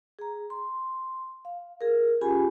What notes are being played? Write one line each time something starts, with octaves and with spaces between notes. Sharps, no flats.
G#4 A#5
C6
F5
G#4 A#4
C#4 F4 G4 G#4 G#5 B5